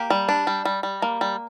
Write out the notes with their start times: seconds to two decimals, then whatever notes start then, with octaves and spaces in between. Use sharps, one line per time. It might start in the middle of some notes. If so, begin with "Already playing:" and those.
Already playing: A#3 G4
0.10 G3
0.29 D4
0.47 G3
0.65 G3
0.83 G3
1.02 A#3
1.21 G3